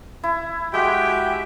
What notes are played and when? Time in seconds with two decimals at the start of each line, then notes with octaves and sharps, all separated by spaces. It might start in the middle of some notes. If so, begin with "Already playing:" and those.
0.24 E4
0.74 G#3 F#4 G4 E5 G5